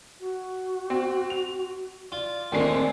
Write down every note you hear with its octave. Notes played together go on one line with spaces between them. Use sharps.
F#4
C4
F7
F4 D5
D#2 A#2 G#3 A3 C4 D4 C7